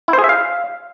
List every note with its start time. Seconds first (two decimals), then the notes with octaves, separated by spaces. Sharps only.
0.08 E4
0.13 C5
0.19 G#4
0.24 E5
0.29 F5